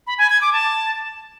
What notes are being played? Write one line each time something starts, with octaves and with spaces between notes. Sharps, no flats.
B5
G#5
G#6
D6
A5